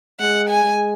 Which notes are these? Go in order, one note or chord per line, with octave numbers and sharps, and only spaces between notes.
G#3 F#5
G#5
G#3